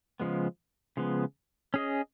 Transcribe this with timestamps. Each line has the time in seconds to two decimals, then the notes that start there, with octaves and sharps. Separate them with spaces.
0.20 C#3 F3 G#3 B3
0.97 C#3 F3 G#3 B3
1.74 C#4 G#4 D#5